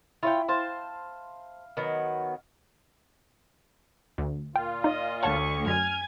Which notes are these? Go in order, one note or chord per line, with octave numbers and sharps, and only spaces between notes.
E4 F4 C#5 G5
C5 F5 A5
D#3 F#3 B3
D2
A#2 F4 G5
D#4 D5 D#5
D2 C#5 F#5 A5 C#6
F#2 G#5 F6 G#6